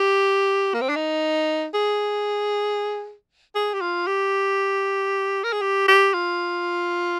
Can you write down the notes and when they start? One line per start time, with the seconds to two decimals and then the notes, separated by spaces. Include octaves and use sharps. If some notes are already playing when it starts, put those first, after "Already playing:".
Already playing: G4
0.74 A#3
0.81 C4
0.89 D4
0.96 D#4
1.74 G#4
3.55 G#4
3.74 G4
3.81 F4
4.07 G4
5.44 A#4
5.52 G#4
5.62 G4
5.88 G4
6.14 F4